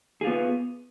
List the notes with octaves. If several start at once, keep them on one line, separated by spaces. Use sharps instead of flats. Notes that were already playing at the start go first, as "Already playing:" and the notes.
B3 F4 G#4